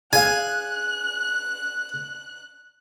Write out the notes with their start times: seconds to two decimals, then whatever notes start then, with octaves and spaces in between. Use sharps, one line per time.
0.13 G#4 F5 G#5 F#6